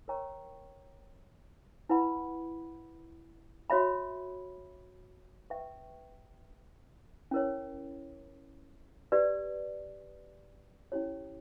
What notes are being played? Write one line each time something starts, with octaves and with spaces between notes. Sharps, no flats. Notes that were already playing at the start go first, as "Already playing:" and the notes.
A#4 C#5 G5 A#5 C#6
E4 B4 F#5 B5
F#4 C#5 E5 B5
B4 E5 G5 C#6
C#4 E4 A#4 C#5
G4 B4 D5
C#4 E4 G4 C#5